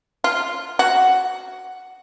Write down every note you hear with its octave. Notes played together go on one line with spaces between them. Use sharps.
F4
F#4